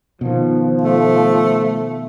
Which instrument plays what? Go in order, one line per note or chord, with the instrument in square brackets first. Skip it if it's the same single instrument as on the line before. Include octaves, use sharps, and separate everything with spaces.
[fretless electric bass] B2 D#3 [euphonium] F3
[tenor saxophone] A3